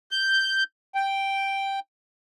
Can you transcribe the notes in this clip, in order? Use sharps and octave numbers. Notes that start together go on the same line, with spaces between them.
G6
G5